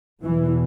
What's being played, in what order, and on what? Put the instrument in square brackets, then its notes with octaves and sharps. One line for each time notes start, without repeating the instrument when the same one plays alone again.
[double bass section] E2 B2 E3